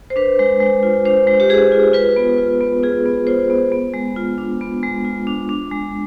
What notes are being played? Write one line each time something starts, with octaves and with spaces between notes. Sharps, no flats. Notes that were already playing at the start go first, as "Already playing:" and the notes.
C5
D4 B4
G#3
G#3
F4
D4 C5
G#3
G4
G#3 G#4
F4
F4 B4
B3
F4
B3
F4 G#4
B3
F4 C5
B3
B3
G#3
F4
D4
B3
G#3
F4
D4
D4
G#3